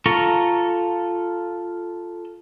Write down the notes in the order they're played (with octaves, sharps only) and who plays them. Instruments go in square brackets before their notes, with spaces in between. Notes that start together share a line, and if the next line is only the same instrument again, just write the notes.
[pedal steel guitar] F4 A4 A#5 C#6